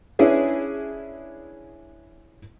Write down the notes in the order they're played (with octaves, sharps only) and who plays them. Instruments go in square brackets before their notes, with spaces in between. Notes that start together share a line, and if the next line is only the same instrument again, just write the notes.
[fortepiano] C#4 D4 E4 G#4 B4